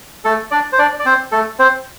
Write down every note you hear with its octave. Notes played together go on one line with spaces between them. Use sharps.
A3 A4
D4 D5
C5
D4 D5
D5
C4 C5
A3 A4
C4 C5